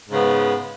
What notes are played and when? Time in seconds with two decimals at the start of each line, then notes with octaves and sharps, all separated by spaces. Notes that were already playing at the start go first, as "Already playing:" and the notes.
0.07 G#2
0.11 C#3
0.16 B3